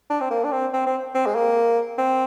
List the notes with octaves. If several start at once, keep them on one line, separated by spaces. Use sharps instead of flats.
D4
C4
A#3
D4
C4
C4
C4
C4
G#3
A#3
C4